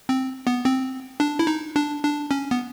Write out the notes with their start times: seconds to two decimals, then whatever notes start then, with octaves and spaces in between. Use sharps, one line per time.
0.09 C4
0.47 B3
0.65 C4
1.20 D4
1.39 E4
1.47 D#4
1.76 D4
2.03 D4
2.31 C#4
2.51 B3